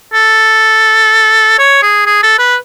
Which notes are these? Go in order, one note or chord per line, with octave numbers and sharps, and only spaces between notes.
A4
C#5
G#4
G#4
A4
B4